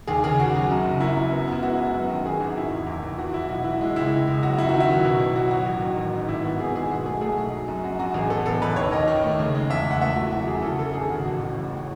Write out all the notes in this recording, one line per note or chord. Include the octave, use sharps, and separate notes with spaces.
D#2 G#4
C#3 G#4
C#3 F#4
F#3
F#2
F#1
F#2 E4
F#2
B3
B3 E4
G#3 F#4
B3
F#2
D#3
F#4
D#3 G#4
G#1 F#4
D#3 E4
E2
E2
E2
E3 F#4
E3 E4
B1 F#4
E3 E4
G#3
C#2 E4
C#2
C#2
F#3 F#4
F#2 E4
D#3 F#4
E4
F#3
B2
B2
F#3 F#4
F#3 F#4
A1
D#3
A1
G#2
G#1 E4
B3 F#4
G#1 G#4
G#2 G#4
B1 F#4
A3 G#4
A3 G#4
B1
F#3
F#2
F#2 F#4
F#2 F#4
A1 G#4
B3 A4
A1 A4
A1 B4
D#2 C#5
D#2 D#5
D#3
A3
C#3
G#3
E2 E5
E2
F#5
A3 E5
E3 F#4
F#2 F#4
E3 G#4
C#3 A4
C#3 A4
A4
G#1 G#4
C#3 F#4
A1 F#4
A2
A1
A2